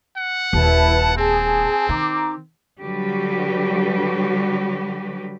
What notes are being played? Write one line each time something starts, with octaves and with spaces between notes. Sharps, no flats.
F#5
D#1 D#2 E4 B4 A5
C4 G#4 A5
D#3 D#4 A#5 D6
D3 F#3 G3 F#4 G4 B4